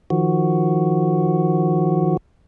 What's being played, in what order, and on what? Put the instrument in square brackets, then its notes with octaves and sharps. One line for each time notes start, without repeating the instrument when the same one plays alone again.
[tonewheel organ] D#3 F3 F#4